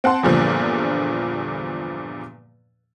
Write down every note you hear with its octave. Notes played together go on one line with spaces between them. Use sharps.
C4 F#5 A5 C6
E2 G2 A#2 D3 F3